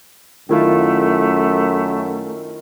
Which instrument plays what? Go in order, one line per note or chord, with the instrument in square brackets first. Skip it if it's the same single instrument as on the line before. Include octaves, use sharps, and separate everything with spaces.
[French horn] F#2 [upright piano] D#3 E4 F4 [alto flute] A3